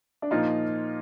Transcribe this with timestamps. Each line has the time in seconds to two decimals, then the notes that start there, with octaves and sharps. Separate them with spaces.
0.22 D4
0.31 A#2 F3 A#3 D#4 F4